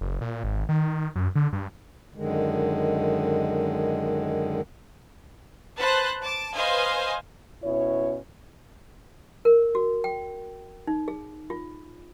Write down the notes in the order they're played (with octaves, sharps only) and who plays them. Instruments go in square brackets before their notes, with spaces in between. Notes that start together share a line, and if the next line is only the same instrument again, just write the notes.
[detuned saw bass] F#1
A#2
G#1
D#3
F#2
D3
G2
[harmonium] F#2 D3 D#3 G#3
[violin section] B4 C5 A5 F#6
A5 D6
B4 C5 D#5 F5 G#5
[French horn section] B2 C#4 E4 C#5
[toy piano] A#4
F#4
G5
D#4
G#4
F4